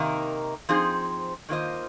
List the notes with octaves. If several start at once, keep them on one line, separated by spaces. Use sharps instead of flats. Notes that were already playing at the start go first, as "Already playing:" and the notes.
Already playing: C3 D#3 A#3 D#4 A#4
F3 C4 D#4 G#4 C5
D#3 A#3 F4 C5 D#5